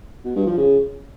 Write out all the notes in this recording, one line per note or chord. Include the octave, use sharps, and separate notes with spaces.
B2
G2
F3
C#3